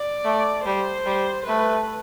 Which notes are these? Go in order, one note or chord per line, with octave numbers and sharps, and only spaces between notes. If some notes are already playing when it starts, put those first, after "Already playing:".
Already playing: D5
A3
G3 C5
G3
A3 B4